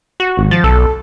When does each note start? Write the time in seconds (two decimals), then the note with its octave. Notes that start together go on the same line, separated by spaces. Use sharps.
0.20 F#4
0.37 G#1
0.51 F3 A6
0.64 B1 A4